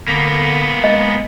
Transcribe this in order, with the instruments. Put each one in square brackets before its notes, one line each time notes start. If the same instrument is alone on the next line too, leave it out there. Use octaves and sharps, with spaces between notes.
[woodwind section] D3 [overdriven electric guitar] A#3 B3
[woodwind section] G#3 [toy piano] D#5